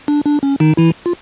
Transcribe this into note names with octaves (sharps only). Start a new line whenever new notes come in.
D4
D4
C#4
D#3 D#4
E3 E4
F4